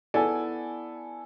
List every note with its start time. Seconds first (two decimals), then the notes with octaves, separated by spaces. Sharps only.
0.14 B3 E4 A4 D5 G#5